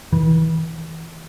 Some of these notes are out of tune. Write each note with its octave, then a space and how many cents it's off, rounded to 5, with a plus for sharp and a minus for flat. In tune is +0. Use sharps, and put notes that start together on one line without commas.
E3 -30